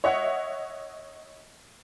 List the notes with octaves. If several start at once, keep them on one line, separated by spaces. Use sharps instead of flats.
C#5 D#5 E5 F#5